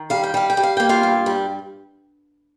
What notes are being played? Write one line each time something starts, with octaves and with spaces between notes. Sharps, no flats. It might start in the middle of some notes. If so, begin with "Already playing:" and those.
Already playing: D#3
G3 F5
G5
G3 F5
G5
G3
F5
A#3 G5
F4 F5
G2
G3